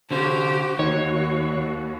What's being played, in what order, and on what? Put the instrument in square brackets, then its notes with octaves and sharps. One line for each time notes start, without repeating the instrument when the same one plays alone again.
[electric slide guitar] D3 C#4 [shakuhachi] F#4 [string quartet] G4 C5
[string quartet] D#2 [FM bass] D#3 [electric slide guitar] C#5